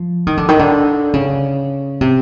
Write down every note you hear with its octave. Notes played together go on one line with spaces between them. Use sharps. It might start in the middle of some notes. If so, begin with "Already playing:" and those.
Already playing: F3
D#3
D3
D#3
D3
C#3
C3